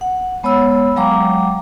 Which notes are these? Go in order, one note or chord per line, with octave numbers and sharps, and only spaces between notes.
F#5
G#3 B3 C#5 B5 E6
F#3 G#3 F5 G5 A#5 D6